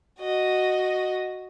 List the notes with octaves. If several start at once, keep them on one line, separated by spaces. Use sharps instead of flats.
F#4 D#5